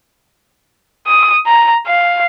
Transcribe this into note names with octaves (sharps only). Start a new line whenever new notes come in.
D#6
A#5
F5